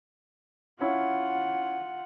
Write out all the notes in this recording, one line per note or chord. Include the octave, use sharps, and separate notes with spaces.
C#4 E4 F4 F#5